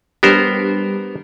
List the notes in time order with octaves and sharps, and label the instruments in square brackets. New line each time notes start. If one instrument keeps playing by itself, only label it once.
[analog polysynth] G3 D4 G4 [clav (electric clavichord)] B3 A#4 C5